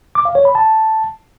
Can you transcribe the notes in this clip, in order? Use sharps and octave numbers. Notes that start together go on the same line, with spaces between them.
D6
F5
C#5
B5
A5